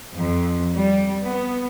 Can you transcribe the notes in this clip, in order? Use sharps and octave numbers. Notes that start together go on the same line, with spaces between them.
F2
G3
B3